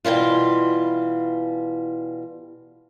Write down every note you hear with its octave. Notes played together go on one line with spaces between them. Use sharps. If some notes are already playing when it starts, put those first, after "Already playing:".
B2 E3 G3 F4